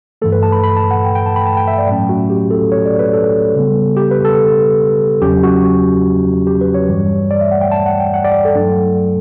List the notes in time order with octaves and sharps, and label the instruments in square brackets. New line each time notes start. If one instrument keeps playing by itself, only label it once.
[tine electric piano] G2 E3 A3 A4
B4
A5
B5
B5
A5
F#5
G5
G5
A5
B5
A5
G5
E5
D5
A2 F#3 A3 C#4
F#4
G4
A4
C#5
D5
B4
A4
C#3 G3 B3
G4
B4
A4
E2 C#3 F#3 C#4 G4
F#4
G4
B4
C#5
G2 E3 G3
D5
E5
F#5
G5
A5
F#5
G5
F#5
D5
A4
G2 F#3 A3 D4